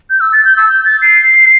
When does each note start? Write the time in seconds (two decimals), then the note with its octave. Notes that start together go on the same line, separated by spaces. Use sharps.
0.10 G6
0.20 E6
0.33 A6
0.45 G6
0.57 E6
0.70 G6
0.85 A6
1.02 C7